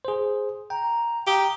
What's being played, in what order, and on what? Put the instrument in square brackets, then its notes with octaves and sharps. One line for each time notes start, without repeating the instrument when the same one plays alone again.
[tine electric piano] G#4 C5
[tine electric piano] G5 [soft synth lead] A#5
[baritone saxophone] G4 [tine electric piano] F5 D#6 [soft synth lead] A#5